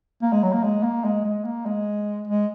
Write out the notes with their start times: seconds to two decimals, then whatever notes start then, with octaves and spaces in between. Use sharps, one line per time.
0.22 A#3
0.33 G#3
0.43 F#3
0.53 A#3
0.64 G#3
0.83 A#3
1.04 G#3
1.25 G#3
1.45 A#3
1.66 G#3
2.28 G#3